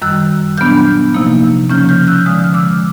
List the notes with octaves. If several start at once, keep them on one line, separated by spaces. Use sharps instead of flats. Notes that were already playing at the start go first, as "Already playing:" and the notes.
F#2 D#3 G3 E6 F#6
A#2 F#3 B3 D4 F6 G6
C3 F3 A#3 D#4
C#3 F3 A#3 C#4 F6 G6
F6 G6
E6 F#6
D3 F3 G#3 D#6 F6
F6
D6 E6